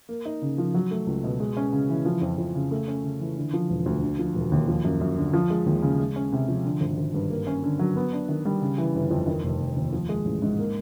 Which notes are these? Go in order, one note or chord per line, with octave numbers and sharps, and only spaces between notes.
A#3
D#4
C#3
F3
F#3
A3
C#2
B2
G#3
C#4
C#3
E3
F3
F2
F2
C#3
A3
C#4
C#3
E3
D3
F3
E1
D2
D3
F3
E1
D#2
F3
F#2
F#2
D3
F3
G#3
D#2
C#3
G#3
C#4
C3
F3
D3
G#1
G#1
G2
A#3
C#4
D3
F#3
B3
D4
D#3
G3
C#3
E3
G1
F2
D#3
F1
F1
D#2
F3
G#3
A1
G#2
A#3